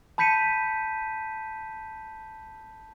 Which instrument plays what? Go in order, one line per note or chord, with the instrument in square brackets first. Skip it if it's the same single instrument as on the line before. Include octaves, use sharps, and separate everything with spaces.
[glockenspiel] A5 B5 G6 B6 C#7 D#7